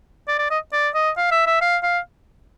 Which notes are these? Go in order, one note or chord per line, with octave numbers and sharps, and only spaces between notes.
D5
D5
D#5
D5
D#5
F5
E5
E5
F5
F5